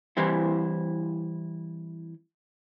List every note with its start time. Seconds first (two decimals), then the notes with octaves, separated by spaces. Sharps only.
0.17 E3 G3 C4 E4